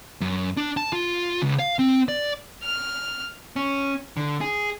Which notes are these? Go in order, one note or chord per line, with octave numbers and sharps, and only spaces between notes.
F#2
D4
A5
F4
C#2
F5
C4
D5
F6
C#4
D3
G#4